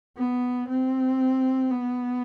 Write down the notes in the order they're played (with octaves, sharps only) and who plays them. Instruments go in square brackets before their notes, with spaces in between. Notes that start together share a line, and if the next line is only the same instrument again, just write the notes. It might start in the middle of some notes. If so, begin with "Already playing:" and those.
[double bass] B3
C4
B3